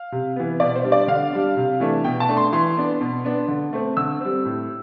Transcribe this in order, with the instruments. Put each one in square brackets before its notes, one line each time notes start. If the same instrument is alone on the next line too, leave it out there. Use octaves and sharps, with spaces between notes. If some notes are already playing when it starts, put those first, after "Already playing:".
Already playing: [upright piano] F5
C3
E3 B3
B2 D5
C5
G3 D4
D5
D3 F5
G3 D4
C3
E3 A3 D4
B2 G5
A5
A3 D4
C6
E3 C6
B3 D4
B2
B3 D4
D3
A3 C4
D3 E6
G3 C4
A2